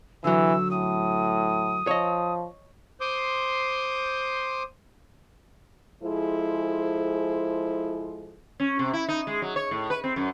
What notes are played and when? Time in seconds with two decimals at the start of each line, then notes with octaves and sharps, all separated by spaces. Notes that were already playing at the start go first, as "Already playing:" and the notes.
0.24 D3 E3 F#3 E6
0.71 A2 D#6
1.87 F3 C#5 D#5
3.01 C5 C6 D6 D#6 G6
6.03 F3 G#3 E4 G#4 A4 C5
8.60 C#4
8.79 C3
8.93 E4
9.09 D#4
9.27 G#3
9.42 F#3
9.56 C#5
9.71 A2
9.90 B4
10.04 C4
10.16 F#2